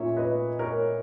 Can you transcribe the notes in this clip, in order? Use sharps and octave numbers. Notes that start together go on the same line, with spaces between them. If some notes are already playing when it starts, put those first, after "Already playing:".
Already playing: A#2 A#3 C#4 C#5 E5
B4 D#5
A#4 C#5